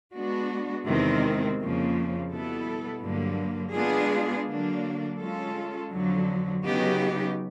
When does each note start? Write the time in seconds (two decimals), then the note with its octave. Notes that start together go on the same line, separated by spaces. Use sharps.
0.14 G#3 B3 D4 F#4
0.86 E2 C3 D#3 G#3 C4
1.58 F2 C#3 F3 A#3
2.31 B2 G3 B3 E4 A4
3.03 G2 D3 F#3 A#3
3.75 G#3 B3 D4 F4 G#4
4.47 D3 F#3 A#3 D4
5.20 G#3 C#4 F4 A4
5.92 F2 D3 F#3
6.64 C#3 F#3 B3 D#4 G4